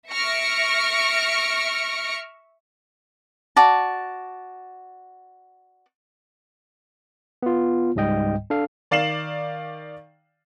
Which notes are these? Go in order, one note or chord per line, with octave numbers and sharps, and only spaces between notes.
E5 C#6 F6 A#6 C#7 D7
F#4 D5 A5
B3 F4
C#2 G#2 G3 D#5 G5
D4 A4 F5
D#3 D5 F5 C7 E7 F#7